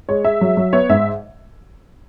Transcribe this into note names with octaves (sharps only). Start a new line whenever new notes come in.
G#3 C#5
G#3 E5
F#3
F#3
B3 C#5
G#2 E5